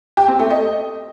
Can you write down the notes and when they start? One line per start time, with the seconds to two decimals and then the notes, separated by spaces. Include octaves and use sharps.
0.17 G4
0.28 C4
0.39 A3
0.50 D#5